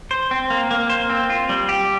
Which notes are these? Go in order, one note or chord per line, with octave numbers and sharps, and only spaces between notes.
C5
C4
A#3
A#3
C5
C4
F4
G3
G4